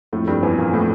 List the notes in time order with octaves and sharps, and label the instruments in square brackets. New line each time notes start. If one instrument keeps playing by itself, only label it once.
[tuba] F2 [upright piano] A2 A3
[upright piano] G2 G3
E2 E3
A#2 A#3
A2 A3